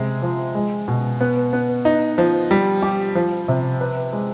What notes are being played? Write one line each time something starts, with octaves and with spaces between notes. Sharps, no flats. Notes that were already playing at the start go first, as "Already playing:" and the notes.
Already playing: C3 G#3
F3
G#3
B2
B3
B3
D#4
F3
G3
G4
F3
C3
B4
G#3